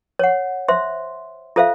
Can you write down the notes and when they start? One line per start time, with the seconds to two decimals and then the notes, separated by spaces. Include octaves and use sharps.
0.19 C#5 F#5
0.68 C5 E5 C6
1.56 F4 A4 C5 E5 F5